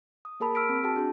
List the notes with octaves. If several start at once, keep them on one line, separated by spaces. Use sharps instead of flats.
D#6
A#3 G#4 A#4 A5 B5
E6 F6 B6 D7
C4
F#4 G#4 G5 A5
D4 F#4 G#4